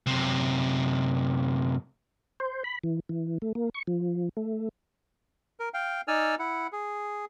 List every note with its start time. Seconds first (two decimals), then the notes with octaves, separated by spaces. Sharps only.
0.06 F#2 C3
2.40 C5
2.64 B5
2.84 E3
3.09 E3
3.42 A3
3.55 A#3
3.74 C#6
3.87 F3
4.37 A3
5.60 A#4
5.74 F5 G5
6.08 D#4 D5 G#5 E6 F6
6.39 E4 F#5
6.72 G#4